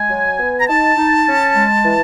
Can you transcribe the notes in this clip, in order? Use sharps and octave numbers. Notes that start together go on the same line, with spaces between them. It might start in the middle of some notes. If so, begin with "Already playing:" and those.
Already playing: G#3 G#5
F#3
B3
A#5
D#4 A5
D#4
C#4
G#3
E3